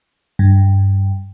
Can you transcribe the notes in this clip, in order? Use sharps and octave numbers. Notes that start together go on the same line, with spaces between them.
G2